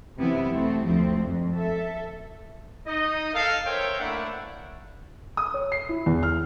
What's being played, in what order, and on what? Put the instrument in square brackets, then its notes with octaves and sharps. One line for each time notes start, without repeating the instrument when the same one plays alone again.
[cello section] F#2 C3 E3 B3 E4
A3 C4
D2 F3 C4
F2
A4 E5
[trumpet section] D#4 D#5
A4 A#4 F5
A#4 C5 C#5 E5 G5
A3 A#3 D4 E4 E5 F#5
[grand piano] D#6
C#5
C7
E4
E2
F6